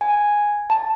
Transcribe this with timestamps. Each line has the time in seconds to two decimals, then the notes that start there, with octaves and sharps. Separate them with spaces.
0.01 G#5
0.70 A5